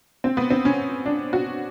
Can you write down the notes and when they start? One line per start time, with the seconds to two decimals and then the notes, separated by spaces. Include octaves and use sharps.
0.24 C4
0.37 B3
0.50 C4
0.65 C#4
1.06 D4
1.33 F#4